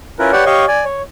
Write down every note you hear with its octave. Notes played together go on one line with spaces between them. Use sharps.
C#4 E4 F4 A#4 B4
G4 B4 C#5 D5 F#5 G5
G4 C#5 D#5 F5 C#6
D5 G#5
C#5